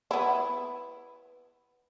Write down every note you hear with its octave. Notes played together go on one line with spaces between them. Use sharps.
B3 E4